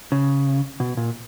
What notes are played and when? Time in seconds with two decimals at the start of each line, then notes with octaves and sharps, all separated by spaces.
0.12 C#3
0.80 B2
0.97 A#2